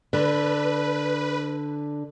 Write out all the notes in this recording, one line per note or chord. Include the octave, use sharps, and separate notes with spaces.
D3 B4